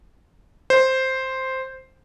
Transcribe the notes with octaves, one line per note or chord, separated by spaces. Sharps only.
C5